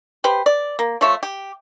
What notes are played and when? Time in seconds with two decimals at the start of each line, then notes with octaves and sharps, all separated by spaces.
0.24 G4 B4 C5
0.46 D5
0.79 A#3
1.01 F3 A3 C#5 E5
1.23 G4